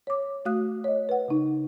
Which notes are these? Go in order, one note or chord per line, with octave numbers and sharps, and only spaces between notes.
C#5 D6
A3 F#4 F5 D#6 F#6
C#5 D#5
B4 F#5
C#3 D#4